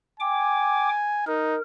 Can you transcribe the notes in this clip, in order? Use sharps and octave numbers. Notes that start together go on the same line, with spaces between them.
G5 G#5 D6
D#4 A#4